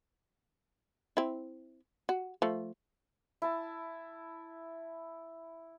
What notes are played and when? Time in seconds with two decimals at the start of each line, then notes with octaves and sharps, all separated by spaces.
1.17 C4 E4
2.09 F#4
2.42 F3 A3
3.42 E4 A5